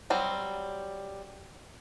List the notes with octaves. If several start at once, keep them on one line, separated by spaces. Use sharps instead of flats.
F#3 G3 C4